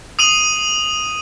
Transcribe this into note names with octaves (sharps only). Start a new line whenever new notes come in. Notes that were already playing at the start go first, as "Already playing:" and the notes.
D#6 D#7 F#7